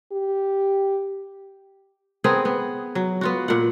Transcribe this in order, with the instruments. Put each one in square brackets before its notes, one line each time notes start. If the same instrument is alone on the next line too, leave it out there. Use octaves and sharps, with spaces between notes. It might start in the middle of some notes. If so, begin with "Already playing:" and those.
[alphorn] G4
[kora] B3 C4 G#4 A#4
B3
F#3
B3 F4 F#4
A#2 F#5